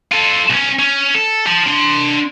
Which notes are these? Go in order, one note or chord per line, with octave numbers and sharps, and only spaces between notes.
F4 A4
B1 C#4
C#4
A4
C5 A5
D4 C6